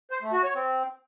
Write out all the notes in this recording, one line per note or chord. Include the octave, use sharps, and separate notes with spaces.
C5
A3
F#4
C#5
C4